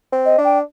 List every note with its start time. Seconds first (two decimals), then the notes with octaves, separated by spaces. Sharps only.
0.12 C4
0.25 D#5
0.38 D4
0.44 G5